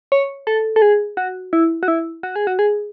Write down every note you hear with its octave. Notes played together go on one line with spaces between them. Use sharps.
C#5
A4
A4
G#4
F#4
E4
F#4
E4
F#4
G#4
F#4
G#4